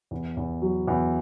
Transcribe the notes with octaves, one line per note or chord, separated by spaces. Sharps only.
E2
E2
F#3
E2